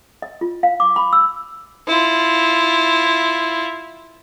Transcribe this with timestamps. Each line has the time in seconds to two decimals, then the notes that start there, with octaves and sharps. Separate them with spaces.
0.22 D#5
0.41 F4
0.63 F5
0.80 D6
0.96 B5
1.13 E6
1.87 E4 F4